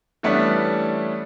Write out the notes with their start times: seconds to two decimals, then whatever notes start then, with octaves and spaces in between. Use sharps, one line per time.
0.23 E3 G3 A3 B3 C#4 D4